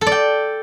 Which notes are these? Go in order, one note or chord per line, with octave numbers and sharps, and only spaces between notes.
A4
D5
G5